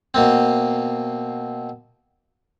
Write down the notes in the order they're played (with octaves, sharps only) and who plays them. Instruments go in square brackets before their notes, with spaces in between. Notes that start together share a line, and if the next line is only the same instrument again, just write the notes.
[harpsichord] B2 A#3 C4